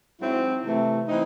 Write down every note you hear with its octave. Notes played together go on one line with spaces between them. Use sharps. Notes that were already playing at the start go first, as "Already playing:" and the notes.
G#2 F#3 C4 E4
C3 E3 A3
E3 C4 D#4